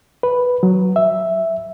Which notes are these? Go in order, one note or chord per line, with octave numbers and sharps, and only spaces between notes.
B4
F#3
E5